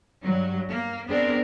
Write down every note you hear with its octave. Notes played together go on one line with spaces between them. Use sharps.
G2 F#3
A#3
B3 C4 D4 G#4 A#4